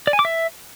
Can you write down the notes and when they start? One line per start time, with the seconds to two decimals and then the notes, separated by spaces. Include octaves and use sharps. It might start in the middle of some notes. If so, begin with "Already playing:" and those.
0.07 D5
0.13 G#5
0.19 D6
0.25 E5